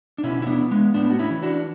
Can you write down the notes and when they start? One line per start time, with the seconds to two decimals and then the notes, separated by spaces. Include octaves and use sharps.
0.18 D4
0.24 B2 C#4 E4
0.42 E4
0.47 B3 D4
0.71 G#3 B3
0.94 A2 B3 D4
1.10 F#4
1.19 C#4 E4
1.30 E3
1.42 D4 F#4